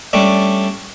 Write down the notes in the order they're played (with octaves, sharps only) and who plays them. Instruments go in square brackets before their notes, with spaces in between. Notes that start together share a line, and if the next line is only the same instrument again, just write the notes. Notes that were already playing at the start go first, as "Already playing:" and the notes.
[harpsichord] G3 A3 C#4 D4